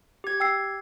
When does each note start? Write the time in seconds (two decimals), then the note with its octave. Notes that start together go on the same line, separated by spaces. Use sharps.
0.24 G4 G#6
0.40 G5 E6 C7